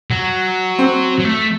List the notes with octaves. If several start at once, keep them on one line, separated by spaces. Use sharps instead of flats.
F#3
C4
F#3
A3